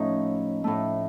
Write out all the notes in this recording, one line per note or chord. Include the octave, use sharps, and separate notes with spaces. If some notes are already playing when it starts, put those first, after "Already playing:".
Already playing: A2 F3 A3 C#4 D#4
A2 A3